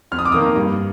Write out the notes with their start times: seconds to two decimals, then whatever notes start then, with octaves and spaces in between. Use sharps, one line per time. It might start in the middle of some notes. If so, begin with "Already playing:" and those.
0.12 F2 F6
0.19 D#6
0.25 D6
0.32 D#3 A#3 D#6
0.56 G2